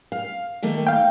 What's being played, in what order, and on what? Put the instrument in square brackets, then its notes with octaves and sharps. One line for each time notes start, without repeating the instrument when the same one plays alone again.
[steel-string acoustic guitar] F5
D#3 A3 A#3
[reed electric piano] F5 G5